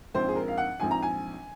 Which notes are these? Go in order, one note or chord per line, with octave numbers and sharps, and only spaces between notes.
A#1 G#2 F3 C4 C5
G#4
A#4
F5
F#5
A#1 G#2 F3 C4 G#5
A#5
G#5